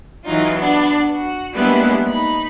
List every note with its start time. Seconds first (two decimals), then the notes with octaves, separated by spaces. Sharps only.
0.25 E3 F#3 D#4 F4
0.54 B3 D4
1.11 F#4
1.54 G3 G#3 A#3 B3 D4 E4
2.08 D#4 B5